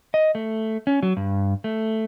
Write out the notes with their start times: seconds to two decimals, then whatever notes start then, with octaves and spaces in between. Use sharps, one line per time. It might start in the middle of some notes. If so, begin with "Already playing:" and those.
0.14 D#5
0.35 A3
0.87 C#4
1.03 F#3
1.17 G2
1.64 A3